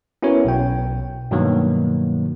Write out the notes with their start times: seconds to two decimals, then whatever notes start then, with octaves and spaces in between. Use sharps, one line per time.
0.23 B3 C#4 E4 F#4 A#4 C#5
0.45 B1 B2 G5
1.31 G2 B2 D#3 F#3 A#3